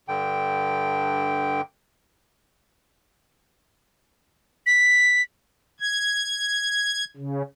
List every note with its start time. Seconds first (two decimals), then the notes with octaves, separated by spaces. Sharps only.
0.08 G2 D3 G5
4.66 B6
5.80 G#6
7.17 C#3